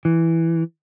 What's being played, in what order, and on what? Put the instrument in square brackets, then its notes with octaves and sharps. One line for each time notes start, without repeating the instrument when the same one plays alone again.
[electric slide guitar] E3